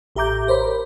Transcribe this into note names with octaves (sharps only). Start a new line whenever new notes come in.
A1 G4 E5 A#5 D6 G6
A#4 C5 C#5 B5
A#4